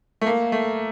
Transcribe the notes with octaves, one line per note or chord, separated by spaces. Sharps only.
A3
A#3
A3